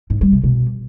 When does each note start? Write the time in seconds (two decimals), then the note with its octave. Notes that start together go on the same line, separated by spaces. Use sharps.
0.10 G#2
0.21 G3
0.32 C3
0.44 B2